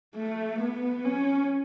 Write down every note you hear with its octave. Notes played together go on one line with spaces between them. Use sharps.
A3
B3
C#4